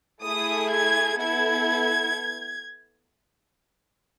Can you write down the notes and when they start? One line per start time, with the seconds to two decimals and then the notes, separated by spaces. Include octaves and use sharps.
0.23 A3 E4 G#4 D#6
0.70 G#6
1.19 B3 E4 A4 G#6